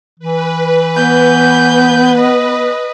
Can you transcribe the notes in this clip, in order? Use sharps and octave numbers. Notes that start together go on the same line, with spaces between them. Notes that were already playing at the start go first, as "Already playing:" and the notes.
E3 B4
B3 G6
D#5